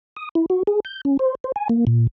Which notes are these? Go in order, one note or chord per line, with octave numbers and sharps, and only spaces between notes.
D#6
E4
F#4
G#4
G6
C#4
C5
C5
G#5
A#3
A#2